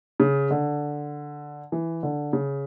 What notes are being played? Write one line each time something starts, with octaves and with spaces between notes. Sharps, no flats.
C#3
D3
E3
D3
C#3